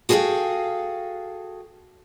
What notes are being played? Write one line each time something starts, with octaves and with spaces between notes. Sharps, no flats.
F#4 G#4 A4 B4 F5 G5